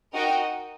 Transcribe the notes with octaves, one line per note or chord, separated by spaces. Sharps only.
D#4 F#4 A#4 D#5 G5